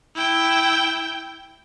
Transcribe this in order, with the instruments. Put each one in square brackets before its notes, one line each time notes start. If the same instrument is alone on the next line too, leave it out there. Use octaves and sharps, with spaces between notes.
[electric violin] E4 G5